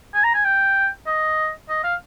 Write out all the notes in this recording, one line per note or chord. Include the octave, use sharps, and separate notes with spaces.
G#5
A#5
G#5
G5
D#5
D#5
F5